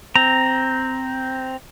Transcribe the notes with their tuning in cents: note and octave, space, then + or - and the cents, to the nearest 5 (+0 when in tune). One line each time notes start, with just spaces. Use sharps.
C4 -5 A#5 +0